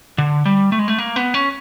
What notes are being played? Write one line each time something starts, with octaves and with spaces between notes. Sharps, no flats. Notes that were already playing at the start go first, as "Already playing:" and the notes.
D3
G3
A3
G#3
A3
A#3
B3
C#4